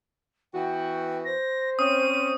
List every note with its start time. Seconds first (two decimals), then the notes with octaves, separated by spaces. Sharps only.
0.54 E3 B3 F#4 G5
1.25 C5 A#6
1.79 C4 C#4 D#6 D#7